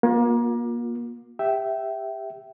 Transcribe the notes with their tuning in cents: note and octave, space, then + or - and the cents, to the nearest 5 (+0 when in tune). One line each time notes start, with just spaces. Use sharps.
A#3 +30 F4 +45
G4 +30 E5 +0 G5 -20